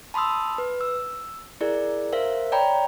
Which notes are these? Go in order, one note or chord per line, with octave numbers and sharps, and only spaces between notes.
A5 B5 C6 D#6 E6
B4
E6
E4 G#4 A#4 D5
A#4 C5 E5 F5
C#5 D5 G5 A#5 B5